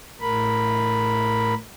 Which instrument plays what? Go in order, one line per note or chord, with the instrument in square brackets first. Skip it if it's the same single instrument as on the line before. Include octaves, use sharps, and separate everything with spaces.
[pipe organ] A2 A#4 B5